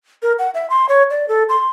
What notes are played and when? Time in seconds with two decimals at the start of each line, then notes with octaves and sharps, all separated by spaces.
0.23 A#4
0.39 F#5
0.54 E5
0.70 C6
0.89 C#5
1.10 D5
1.28 A4
1.49 C6